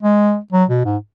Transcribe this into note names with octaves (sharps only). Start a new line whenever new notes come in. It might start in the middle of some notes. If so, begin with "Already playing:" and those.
G#3
F#3
B2
G#2